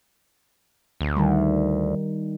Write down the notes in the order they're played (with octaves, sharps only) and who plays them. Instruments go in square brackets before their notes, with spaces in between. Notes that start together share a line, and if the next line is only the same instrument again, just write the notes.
[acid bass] D2
[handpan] D#3 G3